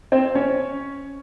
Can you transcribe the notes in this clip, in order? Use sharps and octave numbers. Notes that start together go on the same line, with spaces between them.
C4 C5
C#4 C#5